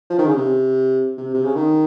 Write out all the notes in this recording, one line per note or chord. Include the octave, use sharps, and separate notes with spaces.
F3
D#3
C#3
C3
C3
C3
C#3
D#3